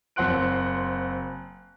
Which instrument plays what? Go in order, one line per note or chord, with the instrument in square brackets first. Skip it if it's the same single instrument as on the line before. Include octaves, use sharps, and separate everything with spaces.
[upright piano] F#1 C4 F#5 C6 F#6 D7